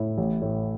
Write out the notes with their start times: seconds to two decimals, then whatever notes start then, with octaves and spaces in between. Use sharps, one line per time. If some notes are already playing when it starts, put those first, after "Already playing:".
Already playing: A2 E4
0.18 A1
0.42 A2